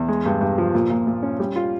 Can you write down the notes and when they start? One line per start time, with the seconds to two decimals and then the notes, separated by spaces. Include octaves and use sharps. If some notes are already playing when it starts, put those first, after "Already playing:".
Already playing: E2
0.08 G#3
0.26 G2
0.41 G2
0.58 F3
0.74 A#2
0.90 A#2
1.07 A#2
1.23 C#4
1.39 G3
1.56 F4